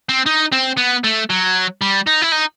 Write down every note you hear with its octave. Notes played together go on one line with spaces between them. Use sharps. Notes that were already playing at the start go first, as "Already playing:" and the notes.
C4
D#4
C4
B3
A3
F#3
G3
D#4
E4
D#4